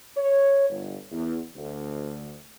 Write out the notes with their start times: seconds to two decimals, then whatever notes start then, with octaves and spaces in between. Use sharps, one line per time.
0.17 C#5
0.70 G1
1.11 E2
1.56 D2